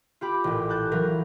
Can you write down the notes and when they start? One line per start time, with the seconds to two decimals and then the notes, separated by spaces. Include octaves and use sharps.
0.21 F4 G4 B5 D6
0.44 A1 A#2
0.69 A5 F#6 G6 A6
0.91 E3 F#3 F4 A#4